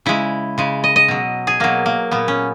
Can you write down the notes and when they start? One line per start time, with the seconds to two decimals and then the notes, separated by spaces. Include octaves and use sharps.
0.06 C#3 G#3 E4
0.58 C#3 G#3
0.84 D#5
0.96 D#5
1.08 B2 F#3
1.47 G#4
1.60 B2 F#3 A#3
1.86 A#3
2.11 A#2 F#3 B3
2.28 C#4